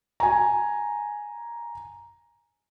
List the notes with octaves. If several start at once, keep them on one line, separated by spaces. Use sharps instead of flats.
G#5 A#5